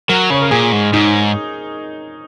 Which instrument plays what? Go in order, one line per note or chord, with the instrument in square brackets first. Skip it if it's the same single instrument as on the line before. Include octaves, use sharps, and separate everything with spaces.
[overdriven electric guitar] F#3 [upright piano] A#4
[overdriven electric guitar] C#3 [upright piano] C#5
[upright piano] A#4
[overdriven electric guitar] A#2 [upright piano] G#4
[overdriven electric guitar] G#2
[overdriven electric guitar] G#2 [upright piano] D#4